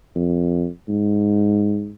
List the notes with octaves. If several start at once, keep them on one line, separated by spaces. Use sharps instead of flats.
F2
G#2